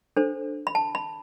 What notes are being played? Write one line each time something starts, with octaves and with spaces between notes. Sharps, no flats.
D4 A4 C5
B5
A5
B5